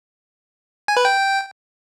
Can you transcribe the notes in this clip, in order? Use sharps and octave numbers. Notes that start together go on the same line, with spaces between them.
G#5
B4
G5